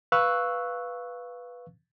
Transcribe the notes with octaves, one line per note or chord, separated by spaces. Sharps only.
B4 F5 C#6 E6 F#6